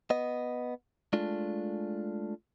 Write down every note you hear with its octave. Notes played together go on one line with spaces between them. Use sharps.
B3 D#5
G#3 A3 D4 F4